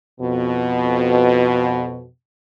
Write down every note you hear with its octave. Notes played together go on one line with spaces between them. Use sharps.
F2 B2